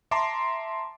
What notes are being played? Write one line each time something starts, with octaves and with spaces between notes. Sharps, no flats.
E5 A5 A#5 C6 D6